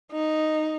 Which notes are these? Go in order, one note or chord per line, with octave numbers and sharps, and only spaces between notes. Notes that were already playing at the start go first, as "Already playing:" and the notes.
D#4